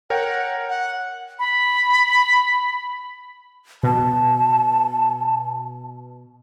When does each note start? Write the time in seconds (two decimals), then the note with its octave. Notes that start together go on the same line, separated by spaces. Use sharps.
0.10 A#4 C#5 F#5 G5
0.69 F#5
1.39 B5
3.83 B2 A5